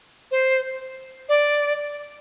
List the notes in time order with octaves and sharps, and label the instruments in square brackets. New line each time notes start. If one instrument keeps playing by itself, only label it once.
[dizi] C5
D5